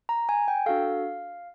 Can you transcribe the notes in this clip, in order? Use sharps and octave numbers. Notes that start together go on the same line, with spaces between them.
A#5
G#5
G5
D4 F#4 A4 F5